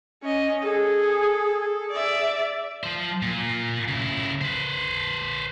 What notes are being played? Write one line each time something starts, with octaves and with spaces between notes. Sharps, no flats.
C#4 D#5
G#4 A4
D5 E5
F3 C5
A#2
C#3 E4
B4 C5